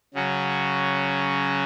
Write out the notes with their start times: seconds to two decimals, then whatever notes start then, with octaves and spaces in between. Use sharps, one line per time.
0.14 C#3 F#3 C#4 F#4